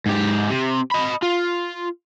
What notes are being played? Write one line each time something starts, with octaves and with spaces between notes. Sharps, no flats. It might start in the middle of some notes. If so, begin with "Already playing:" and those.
G#2 G4
C3
D#5 B5
F4